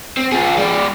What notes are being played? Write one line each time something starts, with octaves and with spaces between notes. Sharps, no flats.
C4
F4 G#4
G#3 D5